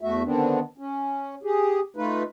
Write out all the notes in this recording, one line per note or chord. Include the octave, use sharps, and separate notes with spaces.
E2 A3 F#4 E5
D3 D#3 B3 C4 D4
C#4
G4 G#4
A3 D#4 F4 B4